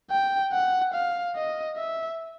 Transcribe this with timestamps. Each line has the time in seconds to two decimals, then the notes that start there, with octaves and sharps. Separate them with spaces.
0.11 G5
0.53 F#5
0.94 F5
1.35 D#5
1.77 E5